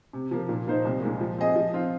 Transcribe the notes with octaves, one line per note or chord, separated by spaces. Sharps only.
C3
F3 A#3
A#2
F3 A#3 D#4 C5
C2
A#2 G#3
F3
C4 G#4 D#5
F3
C4 F4